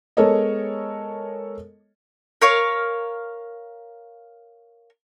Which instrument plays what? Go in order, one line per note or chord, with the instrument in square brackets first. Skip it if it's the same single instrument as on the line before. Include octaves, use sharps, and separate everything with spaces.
[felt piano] G#3 B3 A4 A#4 C#5 D#5
[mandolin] A#4 C#5 F5